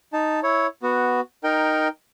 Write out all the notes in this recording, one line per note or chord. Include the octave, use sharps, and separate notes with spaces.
D#4 A5
E4 C#5
B3 F#4
D#4 A#4 G5